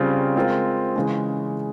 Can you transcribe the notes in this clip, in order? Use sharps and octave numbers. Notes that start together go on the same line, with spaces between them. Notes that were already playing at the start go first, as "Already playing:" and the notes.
Already playing: C#3 G3 C4 F4
G#3 C4 F4 A#4
C#3 E3 G#3 C#4